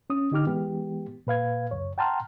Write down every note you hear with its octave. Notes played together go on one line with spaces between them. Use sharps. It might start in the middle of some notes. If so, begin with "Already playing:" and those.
C#4 D#6
D3 D#4 G4 D6 F6
E3 G#3 B3 G4
A#2 B4 F5 G#6
C#2 F#2 C#5
F#5 G5 A5 A#5 C6 F6